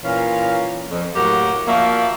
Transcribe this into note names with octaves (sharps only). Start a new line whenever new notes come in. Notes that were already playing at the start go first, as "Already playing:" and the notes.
A#2 E3 C#4 F4 F5
F2
A2 F#3 A#3 F#4 G4 A#4
F3 A#3 F#4 D5 E5 F5